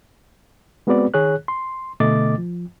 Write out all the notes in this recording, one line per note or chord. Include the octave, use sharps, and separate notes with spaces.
G#3 B3 C4 F#4 B4 D5
D#3 G#4 C#5 F#6
C6
B2 D3 A3 D#5 D6 A6
F3